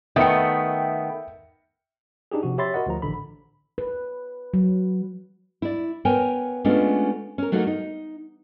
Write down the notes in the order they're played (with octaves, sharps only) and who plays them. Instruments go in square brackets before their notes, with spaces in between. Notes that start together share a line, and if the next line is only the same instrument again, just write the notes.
[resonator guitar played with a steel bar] D#3 A3 B3 [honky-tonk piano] E5 G5 C#7
[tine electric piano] D4 D#4 G4 G#4
C3 F3 F#4
G4 C#5 E5 B5 C6 A6
F#4 A#4 D#5 F#5
D2 F3 A#5
A1 D3 B5
[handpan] B4
F#3
[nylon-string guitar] E4 D5
B3 A#4 C#5 G5 G#5
G#3 A3 B3 C#4 D4 F4
C#4 A#4
F#3 A3 A#3 D#4 F#4
D#4